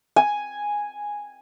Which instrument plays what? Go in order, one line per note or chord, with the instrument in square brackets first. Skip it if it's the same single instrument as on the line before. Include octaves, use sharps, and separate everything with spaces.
[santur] G#5